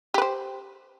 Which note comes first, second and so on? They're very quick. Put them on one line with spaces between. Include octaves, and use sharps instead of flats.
G4 B4 C5